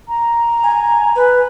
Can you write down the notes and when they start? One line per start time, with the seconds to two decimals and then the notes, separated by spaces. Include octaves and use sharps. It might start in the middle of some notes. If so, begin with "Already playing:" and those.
0.08 A#5
0.63 G#5
1.16 B4